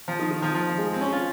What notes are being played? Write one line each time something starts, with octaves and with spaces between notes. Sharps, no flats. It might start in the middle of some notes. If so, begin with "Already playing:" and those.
F3
D#3
D#3
F3
F3
G#3
C4
C#4
F4